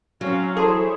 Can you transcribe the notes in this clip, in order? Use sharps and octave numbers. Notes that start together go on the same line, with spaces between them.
F#3 C4 C#4 F5
E4 G#4 A4 C5 C#5 A5 C6